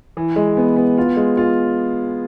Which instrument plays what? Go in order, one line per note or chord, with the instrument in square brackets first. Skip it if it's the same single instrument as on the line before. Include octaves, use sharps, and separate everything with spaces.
[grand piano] E3
G#3
B3
B3
F4
G#3
F4